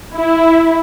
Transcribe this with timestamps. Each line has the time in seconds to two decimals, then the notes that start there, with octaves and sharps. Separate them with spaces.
0.13 E4